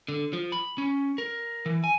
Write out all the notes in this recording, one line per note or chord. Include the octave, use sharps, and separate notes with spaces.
D3
F3
B5
C#4
A#4
E3
G#5